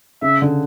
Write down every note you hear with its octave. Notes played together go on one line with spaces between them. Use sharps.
C#3 E5
D3